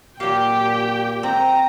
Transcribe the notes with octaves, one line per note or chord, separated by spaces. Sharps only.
A#2 F#3 G4 F5 G5
C4 A#5